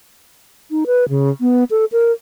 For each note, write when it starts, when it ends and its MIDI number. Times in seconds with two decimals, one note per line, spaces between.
0.71 0.84 63
0.86 1.08 71
1.09 1.30 49
1.41 1.64 59
1.71 1.85 69
1.92 2.12 70